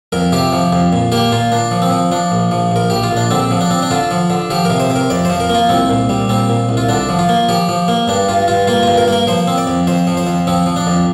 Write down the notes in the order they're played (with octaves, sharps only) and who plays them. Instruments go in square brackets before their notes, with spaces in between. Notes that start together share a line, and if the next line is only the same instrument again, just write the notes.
[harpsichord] F2 A#4
C3 G4
F3
F2
A#2
A#3 G4
A#2 F4
A#2 D4
F3
C4
F3
F3 D4
A#1
F3
A#1 A#4
A#1 G4
F4
A#1
D4
D3 C4
F3
D4
C4
D4
D3 F4
F3
D3
F3 G4
C3 A#4
C5
C3
A#4
F2 D5
F3 C5
A#4
A#3 F4
C2 C4
A#2
G3
A#2 C4
A#2
C2
F4
D3 D4
F3
F4
A#3
F3 G4
F3
A#3
G2 D4
G2 F4
G2 F4
A#3 F4
G2 F4
A#4
A#3 A#4
F3 C5
C4
D5
F2
F2 C5
F3
C5
F2
F3 C4
F3
D4
F2